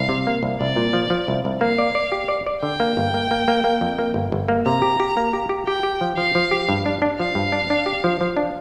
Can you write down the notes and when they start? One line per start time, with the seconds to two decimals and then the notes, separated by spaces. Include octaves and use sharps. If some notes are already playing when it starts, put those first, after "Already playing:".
Already playing: C2 F5
0.09 C3
0.27 A#3
0.43 C2
0.61 C2 D5
0.76 A#2
0.93 F3
1.10 F3
1.28 C2
1.45 C2
1.61 A#3 F5
1.78 D5
1.95 D5
2.12 G4
2.28 D5
2.46 D5
2.63 D3 G5
2.80 A#3
2.97 G1
3.14 A#3
3.31 A#3
3.48 A#3
3.64 A#3
3.81 F2
3.99 A#3
4.14 G1
4.32 G1
4.48 A#3
4.66 C3 A#5
4.82 G4
5.00 G4
5.17 A#3
5.33 G4
5.49 G4
5.67 G4 G5
5.83 G4
6.01 F3
6.17 F3 F5
6.35 F3
6.51 G4
6.69 G2
6.86 D4
7.02 D4
7.19 F3 F5
7.35 G2
7.52 D4
7.70 D4
7.86 G4
8.04 F3
8.21 F3
8.37 D4